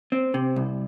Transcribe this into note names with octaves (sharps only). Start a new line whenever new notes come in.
C4
C3
C2